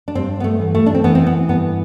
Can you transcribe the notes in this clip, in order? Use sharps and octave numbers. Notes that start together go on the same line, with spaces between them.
D4
G2 C4
B3
A3
E3
A3
D4
C4
E3 B3
C4
B3
G2 B3